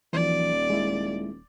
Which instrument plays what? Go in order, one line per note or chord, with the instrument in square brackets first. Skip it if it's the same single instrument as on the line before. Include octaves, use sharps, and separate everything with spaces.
[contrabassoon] D#1 [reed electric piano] E3 F3 [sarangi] D5
[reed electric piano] G#3 E4